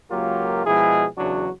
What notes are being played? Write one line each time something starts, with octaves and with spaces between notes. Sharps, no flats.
C#2 F#3 A#3 F4 G4 A#4
B2 F3 G#3 E4 G#4
E2 C#3 F#3 D4 F#4